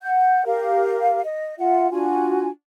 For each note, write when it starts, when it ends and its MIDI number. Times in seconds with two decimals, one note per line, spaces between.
0.01 0.45 78
0.01 0.45 91
0.45 1.20 67
0.45 1.20 70
0.45 1.20 77
1.24 1.55 75
1.58 1.89 65
1.58 1.89 76
1.58 1.89 78
1.91 2.47 62
1.91 2.47 65
1.91 2.47 66
1.91 2.47 80